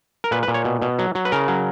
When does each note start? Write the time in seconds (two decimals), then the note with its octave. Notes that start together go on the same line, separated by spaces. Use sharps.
0.24 A#4
0.31 A#2 B4
0.43 B4
0.48 A#2
0.54 C#5
0.65 B2
0.82 B2
0.99 F#3
1.15 F#3
1.25 B4
1.32 C#3 A#4
1.48 F#3